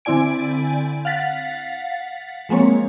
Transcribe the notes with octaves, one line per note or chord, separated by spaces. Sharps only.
D3 C4 E4 D5 G#5 D7
F5 F#5 A6 B6
F3 G#3 A#3 C4 C#5